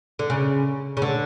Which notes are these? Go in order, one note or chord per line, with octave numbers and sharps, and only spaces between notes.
D3
C#3
C#3
D3